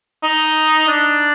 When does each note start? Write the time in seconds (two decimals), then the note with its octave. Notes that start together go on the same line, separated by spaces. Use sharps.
0.23 D#4
0.88 D4